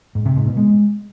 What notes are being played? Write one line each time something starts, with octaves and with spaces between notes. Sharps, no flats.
G#2
C3
G#2
B2
G#3